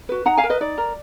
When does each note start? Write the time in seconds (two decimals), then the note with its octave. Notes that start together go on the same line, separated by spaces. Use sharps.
0.09 F#4 B4
0.25 D#4 F#5 A#5
0.37 F5 G#5
0.43 A#4
0.50 B4 D#5
0.61 D#4 D5
0.78 A#4